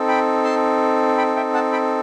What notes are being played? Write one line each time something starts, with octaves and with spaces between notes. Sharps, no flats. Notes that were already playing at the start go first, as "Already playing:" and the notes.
Already playing: C4 D#4 A4
G5 B5
A5 C6
G5 B5
E5 G5
F#5 A5
G5 B5